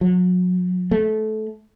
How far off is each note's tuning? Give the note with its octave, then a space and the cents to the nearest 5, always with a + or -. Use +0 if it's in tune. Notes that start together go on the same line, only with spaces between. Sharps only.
F#3 -35
A3 -20